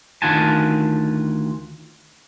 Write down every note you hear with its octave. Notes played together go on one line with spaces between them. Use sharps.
D2 D#3 F4 F#5 G#5 A5